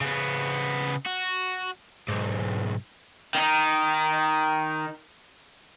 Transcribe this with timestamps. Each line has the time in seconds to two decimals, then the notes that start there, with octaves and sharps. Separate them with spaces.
0.01 C#3 B3
1.06 F#4
2.08 B1 G#2
3.35 D#3 D#4